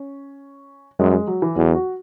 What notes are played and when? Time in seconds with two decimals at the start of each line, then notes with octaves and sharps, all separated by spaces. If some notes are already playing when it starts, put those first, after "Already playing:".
Already playing: C#4
0.99 F#2 G#3
1.13 G#3
1.27 F#3
1.42 E3
1.56 E2 F#3
1.75 F#4